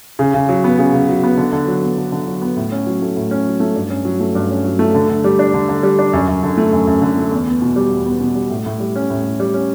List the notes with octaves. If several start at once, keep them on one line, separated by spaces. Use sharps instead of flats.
C#3
C#3
F#3
B3
C#3
C#3
F#3
B3
D3
D3
F#3
B3
D3
D3
F#3
B3
A2
C#4
F#3
A3
A2
C#4
F#3
A3
G2
C#4
F#3
A3
G2
C#4
F#3
A3
D3
D3
G3
D4
D3
D3
G3
D4
F#2
F#2
D3
A3
F#2
F#2
D3
A3
E2
B3
B2
G3
E2
B3
B2
G3
A2
A2
G3
C#4
A2
A2
G3
C#4